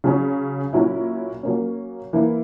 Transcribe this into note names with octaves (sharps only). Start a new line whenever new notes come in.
C#3 F#3 C#4
A#2 F#3 C#4 E4
F#3 A#3 C#4
E3 A#3 E4